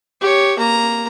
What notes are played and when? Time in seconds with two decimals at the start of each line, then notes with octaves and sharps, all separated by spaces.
0.21 G4 C#5
0.58 A#3 A#5